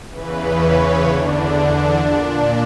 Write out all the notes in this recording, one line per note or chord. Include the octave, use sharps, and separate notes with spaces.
E2 C#3 E3 B4
C#5
E2 D3 D4
D4
A#2